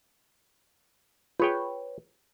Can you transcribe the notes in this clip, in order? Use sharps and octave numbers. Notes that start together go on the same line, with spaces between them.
F4 G#4 B4 C#5 G5